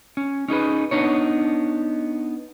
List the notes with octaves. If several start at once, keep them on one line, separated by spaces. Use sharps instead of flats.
C#4
C#4 D#4 G#4 B4
B3 D4 D#4 C#5